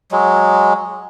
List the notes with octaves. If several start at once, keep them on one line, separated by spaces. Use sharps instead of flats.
F#3 G#3